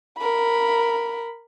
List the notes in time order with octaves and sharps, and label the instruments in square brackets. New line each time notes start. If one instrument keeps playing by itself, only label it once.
[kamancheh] A#4 B5